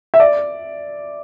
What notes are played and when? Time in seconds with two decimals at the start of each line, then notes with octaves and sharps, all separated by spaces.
0.14 E5
0.20 D5